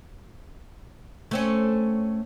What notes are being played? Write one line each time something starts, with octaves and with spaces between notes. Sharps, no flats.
A3 C4 C#4